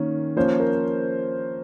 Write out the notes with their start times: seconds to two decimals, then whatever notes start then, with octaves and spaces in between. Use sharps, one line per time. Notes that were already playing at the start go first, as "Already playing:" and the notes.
Already playing: D#3 A#3 C#4
0.36 F3 A#3 C#4 C5
0.60 A#4